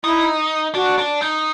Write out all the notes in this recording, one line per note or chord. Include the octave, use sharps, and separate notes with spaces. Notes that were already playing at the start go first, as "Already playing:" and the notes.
D#4 E4
D4 F#4
D4
D#4